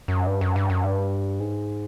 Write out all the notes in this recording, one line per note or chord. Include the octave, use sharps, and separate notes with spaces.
F#2
G2
F#2
G2
F#2
G2
G#2